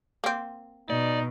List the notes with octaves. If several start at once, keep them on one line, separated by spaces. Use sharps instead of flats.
A#3 C4
B2 D#4 D5